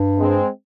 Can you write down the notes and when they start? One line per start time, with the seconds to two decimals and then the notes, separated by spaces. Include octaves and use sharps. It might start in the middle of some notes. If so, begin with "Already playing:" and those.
Already playing: G2
0.18 G#3 C4